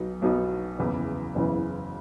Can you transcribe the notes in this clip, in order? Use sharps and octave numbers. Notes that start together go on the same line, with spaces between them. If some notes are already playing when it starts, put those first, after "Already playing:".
Already playing: B1 B2 F#3 B3 D#4
B1 B2 F#3 B3 D#4
F#1 E2 C#3 E3 B3
F#1 E2 C#3 E3 B3